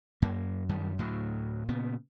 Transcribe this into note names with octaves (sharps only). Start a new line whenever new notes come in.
F#2 A#3
F#2 D#3 G3
D2 A2 F#3
A#2 C#3 B3